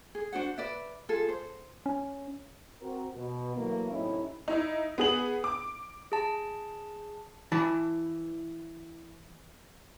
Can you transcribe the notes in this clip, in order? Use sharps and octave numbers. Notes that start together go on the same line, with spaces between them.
G#4
D4 F#4 C5 F#5
B4 D5 E5
F4 G#4 A4
C5
C#4
C4 F#4 A#4
B2
E3 F#3 A3 A#3
F#2 A2 C3 C#4 D#4 E4
D#4 E4
B3 G#4 F#7
D6
G#4 A5
E3 E4 A5 B5